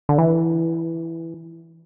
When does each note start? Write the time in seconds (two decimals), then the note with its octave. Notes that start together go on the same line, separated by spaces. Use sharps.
0.09 D3
0.18 E3